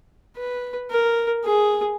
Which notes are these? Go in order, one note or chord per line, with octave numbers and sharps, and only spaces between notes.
B4
A#4
G#4